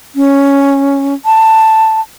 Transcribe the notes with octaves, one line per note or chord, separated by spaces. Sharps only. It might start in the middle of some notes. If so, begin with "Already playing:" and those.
C#4
A5